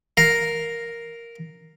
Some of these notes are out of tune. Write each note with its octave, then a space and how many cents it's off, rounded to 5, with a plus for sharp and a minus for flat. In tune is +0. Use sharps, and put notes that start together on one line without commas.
A#4 +0 F5 +0